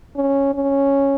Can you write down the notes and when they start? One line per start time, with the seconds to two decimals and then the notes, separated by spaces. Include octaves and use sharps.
0.16 C#4
0.54 C#4